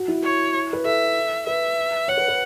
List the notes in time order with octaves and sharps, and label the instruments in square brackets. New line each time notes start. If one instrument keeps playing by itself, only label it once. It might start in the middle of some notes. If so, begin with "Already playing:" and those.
Already playing: [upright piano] F#4
E4
[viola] C#5
[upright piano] B4
[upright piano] A4 [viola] E5
[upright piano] B4 [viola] E5
[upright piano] C#5 [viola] F#5
[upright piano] B4
B4